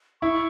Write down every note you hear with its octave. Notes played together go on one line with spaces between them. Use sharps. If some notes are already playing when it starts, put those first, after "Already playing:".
E4 C#6